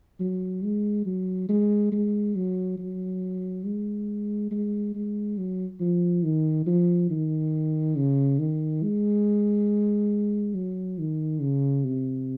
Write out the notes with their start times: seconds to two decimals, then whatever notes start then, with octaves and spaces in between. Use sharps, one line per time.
0.20 F#3
0.63 G#3
1.06 F#3
1.49 G#3
1.92 G#3
2.35 F#3
2.78 F#3
3.65 G#3
4.51 G#3
4.95 G#3
5.38 F#3
5.80 F3
6.24 D#3
6.66 F3
7.10 D#3
7.96 C#3
8.39 D#3
8.82 G#3
10.55 F#3
10.99 D#3
11.41 C#3
11.85 C3